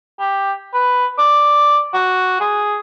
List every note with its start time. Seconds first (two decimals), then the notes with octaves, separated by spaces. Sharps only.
0.20 G4
0.74 B4
1.18 D5
1.94 F#4
2.41 G#4